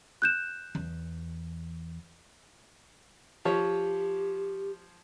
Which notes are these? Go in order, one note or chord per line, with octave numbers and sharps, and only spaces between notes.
F#6 G6 E7
E2
F3 G4 C#5